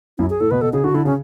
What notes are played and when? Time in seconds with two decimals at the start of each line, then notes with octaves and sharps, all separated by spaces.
0.18 F#2 E4
0.30 G#4
0.40 A2 A4
0.51 B2 B4
0.61 B2 A4
0.73 C#3 G#4
0.84 D3 F#4
0.94 D3 E4
1.05 C#3 C#4